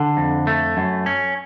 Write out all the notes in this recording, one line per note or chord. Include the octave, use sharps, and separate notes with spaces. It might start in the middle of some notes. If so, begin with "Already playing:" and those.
Already playing: D3
F2
A3
F#2
C#4